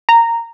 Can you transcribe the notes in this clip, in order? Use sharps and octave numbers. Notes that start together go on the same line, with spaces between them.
A#5